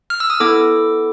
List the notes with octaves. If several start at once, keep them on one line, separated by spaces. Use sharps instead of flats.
F6
E6
D#6
B3 E4 A4 D6